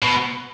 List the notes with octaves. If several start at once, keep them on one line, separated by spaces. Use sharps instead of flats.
B2